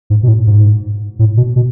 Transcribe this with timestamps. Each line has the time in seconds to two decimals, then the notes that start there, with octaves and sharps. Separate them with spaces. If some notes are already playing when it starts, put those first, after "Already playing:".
0.10 G#2
0.23 B2
0.28 A2
0.47 G#2
1.19 A2
1.37 B2
1.56 B2